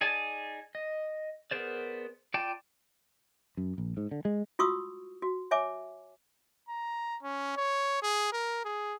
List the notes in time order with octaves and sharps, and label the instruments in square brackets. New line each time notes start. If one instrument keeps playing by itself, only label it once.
[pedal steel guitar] D#4 G#4 D5 G#5 A5
D#5
B3 G#4 A#4 C5 D5
F4 D5 G5 A5
[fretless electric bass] F#2
A#1
G#2
D3
G#3
[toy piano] F4 F#4 C#6 D#6 E6
F#4
C#5 E5 G#5 D6
[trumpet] A#5
C#4
C#5
G#4
A#4
G#4